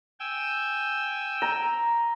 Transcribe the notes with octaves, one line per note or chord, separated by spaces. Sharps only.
G5 G#5 E6
A#5